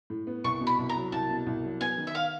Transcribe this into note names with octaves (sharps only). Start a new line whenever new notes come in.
A2
B3
C2 C#6
B2
B5
C2
A#5
F#3
C2 A5
B2
C2
F#3
B3 G#5
D#3
E5
F5